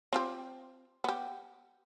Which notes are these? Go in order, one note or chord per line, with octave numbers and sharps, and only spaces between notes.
C4 F4 G4
B3 G4